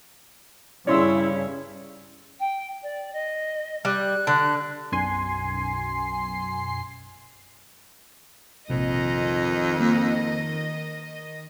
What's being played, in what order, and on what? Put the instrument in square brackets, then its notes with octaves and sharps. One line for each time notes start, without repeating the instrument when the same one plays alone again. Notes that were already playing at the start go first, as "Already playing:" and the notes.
[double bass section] G2 C#3 [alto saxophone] C#4 [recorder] E4 [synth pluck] D5 C6 E6
[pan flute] G5
D5
D#5
[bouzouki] G3 [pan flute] F#6
[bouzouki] D3
[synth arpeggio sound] B1 F#2 G#5 C6 C7
[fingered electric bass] A#1 C3 [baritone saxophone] F2 [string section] D#3 D#5
[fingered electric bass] A#3